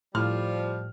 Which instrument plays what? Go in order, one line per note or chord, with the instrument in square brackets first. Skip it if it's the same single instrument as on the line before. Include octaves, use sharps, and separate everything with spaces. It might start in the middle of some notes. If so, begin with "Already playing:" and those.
[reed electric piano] A2 [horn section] F3 G3 [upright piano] F6